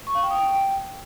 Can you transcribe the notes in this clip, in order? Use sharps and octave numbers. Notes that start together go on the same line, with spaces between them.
C#6
F5
G5
D#6
G5